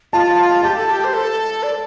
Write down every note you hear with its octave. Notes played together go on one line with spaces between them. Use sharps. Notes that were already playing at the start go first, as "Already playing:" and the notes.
F4 A5
G4 A5
A4
G4
C5
A4
D5